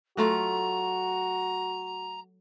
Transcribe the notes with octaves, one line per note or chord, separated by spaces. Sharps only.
F#3 A3 F4 F#4 A#5